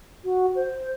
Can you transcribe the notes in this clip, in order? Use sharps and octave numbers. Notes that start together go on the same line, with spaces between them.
F#4
C5